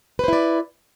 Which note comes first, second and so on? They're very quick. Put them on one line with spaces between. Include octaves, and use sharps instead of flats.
B4 C5 E4 D5